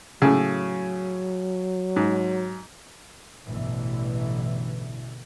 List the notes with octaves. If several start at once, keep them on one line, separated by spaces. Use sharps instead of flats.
A2 C#3 F#3
G#2
A1 G2 B2 D3 E3